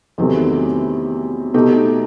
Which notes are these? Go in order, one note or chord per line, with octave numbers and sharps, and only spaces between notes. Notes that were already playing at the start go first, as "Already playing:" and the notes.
E2 C3 D#3 F#3 A3
B2 A3 D#4 G4